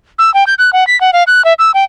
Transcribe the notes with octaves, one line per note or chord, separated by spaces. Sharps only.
E6
G5
G6
F#6
F#5
B6
F#5
F5
F#6
E5
E6
G5